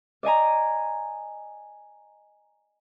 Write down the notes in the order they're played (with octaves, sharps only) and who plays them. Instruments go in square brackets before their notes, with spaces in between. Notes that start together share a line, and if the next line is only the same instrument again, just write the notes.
[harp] D5 D#5 G#5 A#5